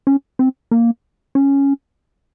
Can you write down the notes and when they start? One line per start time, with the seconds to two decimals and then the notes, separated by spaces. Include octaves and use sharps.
0.07 C#4
0.39 C4
0.71 A#3
1.35 C#4